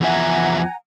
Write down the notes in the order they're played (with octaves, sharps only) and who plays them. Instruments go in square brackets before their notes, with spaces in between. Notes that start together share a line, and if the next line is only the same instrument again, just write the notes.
[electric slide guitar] E2 F3 E5 [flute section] F#5 G#5 A#5